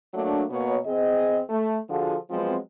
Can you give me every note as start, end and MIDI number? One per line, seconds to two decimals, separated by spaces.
0.14 0.43 54
0.14 0.43 57
0.14 0.43 58
0.14 0.43 62
0.50 0.77 47
0.50 0.77 58
0.50 0.77 73
0.85 1.40 40
0.85 1.40 60
0.85 1.40 68
0.85 1.40 75
1.50 1.78 57
1.89 2.16 50
1.89 2.16 53
1.89 2.16 65
1.89 2.16 66
1.89 2.16 68
1.89 2.16 69
2.31 2.56 53
2.31 2.56 54
2.31 2.56 56
2.31 2.56 59
2.31 2.56 60